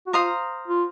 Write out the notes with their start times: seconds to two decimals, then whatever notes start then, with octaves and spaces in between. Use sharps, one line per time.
0.07 F#4
0.13 F4 C5 F5 A#5 D#6
0.68 F4